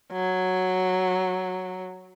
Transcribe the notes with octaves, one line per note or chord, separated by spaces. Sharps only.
F#3